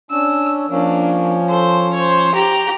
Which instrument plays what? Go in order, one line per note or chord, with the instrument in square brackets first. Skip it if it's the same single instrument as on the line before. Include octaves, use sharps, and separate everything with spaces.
[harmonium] C#4 D4 [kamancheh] E6
[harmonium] F3 C#4 [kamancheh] A#3 D4
[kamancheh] A4 C5
C5 C#5
G4 A#5